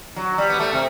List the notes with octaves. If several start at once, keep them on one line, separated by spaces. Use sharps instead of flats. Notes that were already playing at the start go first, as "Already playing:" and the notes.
F#3
G3
B3
A3
C3